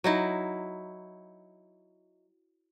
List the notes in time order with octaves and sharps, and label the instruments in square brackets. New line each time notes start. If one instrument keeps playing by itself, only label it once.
[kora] F#3 D#4 E4